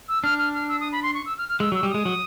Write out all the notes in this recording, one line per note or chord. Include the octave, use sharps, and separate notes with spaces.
E6
D4 F6
F6
F6
E6
D#6
B5
C6
C#6
E6
F6
F6
G#3 E6
F#3
E6
G3
G#3 D#6
F#3